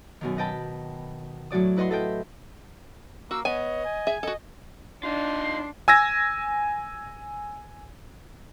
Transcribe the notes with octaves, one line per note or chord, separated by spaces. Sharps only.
F#2 B2 D#3
B4 D#5 G5 A5 B5
A2 F#3 F#4 D5 D#6
E4 B4 D#5 F#5 C6
A4 D#5 E5 G5
A#3 F#4 E6
B3 C#5 D#5 G#5
G#5
G#4 E5
F#4 A4 D#5
D4 D#4 F4 C6
G#5 E6 G#6 A#6